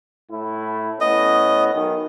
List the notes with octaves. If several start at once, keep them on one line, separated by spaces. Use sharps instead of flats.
A2 E4
A2 B3 C#4 D#5
B1 D#3